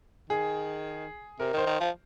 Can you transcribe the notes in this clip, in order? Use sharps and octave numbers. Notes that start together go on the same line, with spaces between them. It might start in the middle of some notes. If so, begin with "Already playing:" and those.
D#3 G#4
C3 A#4
D#3
C5
D#3
F3